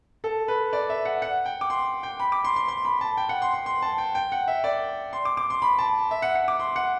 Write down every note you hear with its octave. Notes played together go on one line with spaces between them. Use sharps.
A4
B4
D5
E5
F#5
F#5
G5
D6
C6
G5
B5
D6
C6
C6
C6
B5
A5
G5
F#5
C6
C6
C6
A5
G5
G5
F#5
E5
D5
C6
D6
D6
C6
B5
A5
E5
F#5
F#5
D6
C6
F#5